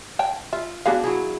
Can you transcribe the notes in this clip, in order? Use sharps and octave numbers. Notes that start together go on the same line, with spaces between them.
C#5 G5 A5
F4 E5
B3 D4 F#4 G#4 F5
F#3 E4 G#4